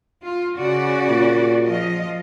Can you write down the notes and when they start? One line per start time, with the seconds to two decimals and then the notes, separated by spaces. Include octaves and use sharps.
0.24 F4
0.57 C#3 F#4 D5
1.10 A#2
1.66 F3 F4 D#5